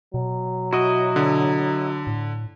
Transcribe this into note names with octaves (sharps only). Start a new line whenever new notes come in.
B2 F#3
E4 F#4 D#5
D3
A2